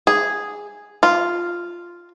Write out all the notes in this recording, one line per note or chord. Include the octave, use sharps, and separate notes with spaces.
G#4
F4